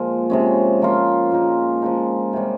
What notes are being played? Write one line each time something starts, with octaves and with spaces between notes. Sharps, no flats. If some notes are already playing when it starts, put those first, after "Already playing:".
Already playing: A#2 F3 G#3 C4
C3 F3 G#3 C#4
F3 A#3 F4
A#2 G#3 D#4
F3 G#3 D#4
C3 G3 C#4